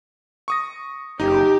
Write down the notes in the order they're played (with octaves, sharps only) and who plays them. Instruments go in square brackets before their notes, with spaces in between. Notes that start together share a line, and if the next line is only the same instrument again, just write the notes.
[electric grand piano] C#6 D#6 A#6
[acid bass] F#1 [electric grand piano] D#4 [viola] G4